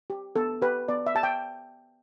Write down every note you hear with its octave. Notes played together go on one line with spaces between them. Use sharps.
G4
B3 A4
G4 B4
B3 D5
E5
G4 A5
G5